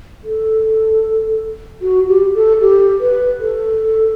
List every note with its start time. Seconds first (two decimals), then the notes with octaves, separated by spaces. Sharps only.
0.24 A4
1.82 F#4
2.08 G4
2.35 A4
2.61 G4
3.00 B4
3.40 A4